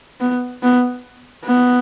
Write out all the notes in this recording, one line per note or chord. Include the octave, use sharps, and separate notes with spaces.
B3
B3
B3